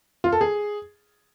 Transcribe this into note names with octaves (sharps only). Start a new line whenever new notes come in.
F4
A4
G#4